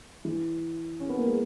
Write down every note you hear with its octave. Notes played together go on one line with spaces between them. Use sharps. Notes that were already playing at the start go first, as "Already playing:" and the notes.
E3
C#4
B3
A#3
G#3